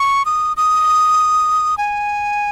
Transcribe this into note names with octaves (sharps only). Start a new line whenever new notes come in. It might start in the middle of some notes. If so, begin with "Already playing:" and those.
Already playing: C#6
D#6
D#6
G#5